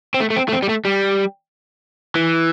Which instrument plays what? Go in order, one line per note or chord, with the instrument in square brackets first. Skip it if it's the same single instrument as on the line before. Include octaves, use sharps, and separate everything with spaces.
[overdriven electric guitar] C4
A3
A3
C4
A3
C4
G3
A3
G3
E3